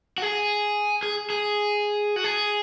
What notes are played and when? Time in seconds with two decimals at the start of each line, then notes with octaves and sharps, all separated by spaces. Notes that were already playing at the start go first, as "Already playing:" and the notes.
0.18 F#4
0.22 G#4
1.03 G#4
1.30 G#4
2.16 F#4
2.24 G#4